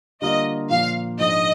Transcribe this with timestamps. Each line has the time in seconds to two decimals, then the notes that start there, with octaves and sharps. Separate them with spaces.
0.22 D3 G3 A#3 F4 D#5
0.70 A#2 F3 A#3 F4 F5
1.19 G#2 F3 G#3 D4 D#5